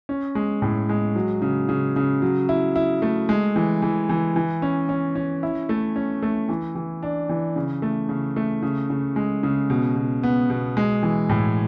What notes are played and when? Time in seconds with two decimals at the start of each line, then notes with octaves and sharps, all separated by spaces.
0.09 C#4
0.35 G#3
0.62 A2
0.89 G#3
1.16 F#3
1.42 C#3
1.69 C#3
1.96 C#3
2.22 F#3
2.49 E4
2.76 E4
3.02 A3
3.29 G#3
3.56 E3
3.82 E3
4.09 E3
4.36 E3
4.62 C#4
4.89 C#4
5.15 C#4
5.43 E4
5.69 A3
5.96 C#4
6.23 A3
6.49 E3
6.75 E3
7.03 D4
7.29 E3
7.56 C#3
7.82 A3
8.09 C#3
8.36 A3
8.62 C#3
8.90 C#3
9.16 G#3
9.43 C#3
9.70 B2
9.96 B2
10.23 B3
10.50 B2
10.77 G#3
11.03 E3
11.29 A2